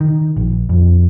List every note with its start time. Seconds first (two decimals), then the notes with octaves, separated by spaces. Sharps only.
0.01 D#3
0.37 A#1
0.69 F2